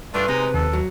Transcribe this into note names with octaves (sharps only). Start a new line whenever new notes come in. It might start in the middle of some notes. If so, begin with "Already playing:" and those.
G2 A3 D4 F4 B4
C3 G#3 D#4
D#2 A4
F#3